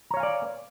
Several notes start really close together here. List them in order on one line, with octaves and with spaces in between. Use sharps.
A#5 C#5 F5 G#5 D5